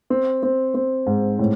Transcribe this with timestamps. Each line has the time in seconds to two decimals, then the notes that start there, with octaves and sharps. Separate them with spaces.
0.10 C4
0.43 C4
0.74 C4
1.07 G#2
1.39 A2